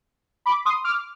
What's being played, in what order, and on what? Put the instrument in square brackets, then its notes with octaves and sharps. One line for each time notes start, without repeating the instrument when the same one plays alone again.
[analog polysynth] B5 D6
C6 D#6
D6 F6